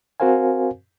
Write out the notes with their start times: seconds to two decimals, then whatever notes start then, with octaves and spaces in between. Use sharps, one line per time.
0.20 C4 F#4 A#4 C5 F5 G#5